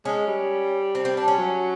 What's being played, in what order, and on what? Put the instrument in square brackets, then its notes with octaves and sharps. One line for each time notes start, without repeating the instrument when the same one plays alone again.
[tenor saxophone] G#3 [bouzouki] C#4
[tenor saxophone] G3
[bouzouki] C4
C4
D4
C#4
[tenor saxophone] F#3